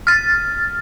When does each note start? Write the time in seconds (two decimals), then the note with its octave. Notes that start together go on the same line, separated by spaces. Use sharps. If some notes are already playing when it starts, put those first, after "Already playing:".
0.07 F6 A6